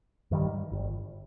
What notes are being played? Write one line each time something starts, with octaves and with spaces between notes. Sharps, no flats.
G2 D#3 G3
G1